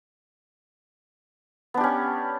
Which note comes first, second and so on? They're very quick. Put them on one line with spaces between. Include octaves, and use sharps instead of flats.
B3 D4 G4 C#4